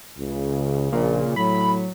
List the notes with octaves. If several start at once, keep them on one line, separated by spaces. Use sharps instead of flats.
C#2 C#3
A#1 A#2
A2 F#3 B5